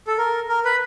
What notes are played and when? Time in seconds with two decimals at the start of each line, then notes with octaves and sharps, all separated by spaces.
0.07 A4
0.18 A#4
0.49 A#4
0.65 B4